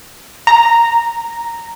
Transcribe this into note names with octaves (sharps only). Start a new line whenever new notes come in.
A#5